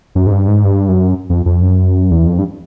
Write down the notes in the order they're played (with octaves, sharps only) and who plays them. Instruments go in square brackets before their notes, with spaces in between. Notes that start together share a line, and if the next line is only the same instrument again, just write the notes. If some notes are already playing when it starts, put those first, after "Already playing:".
[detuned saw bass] F#2
G#2
G2
G#2
G2
F#2
F2
F2
F#2
E2
F2
G2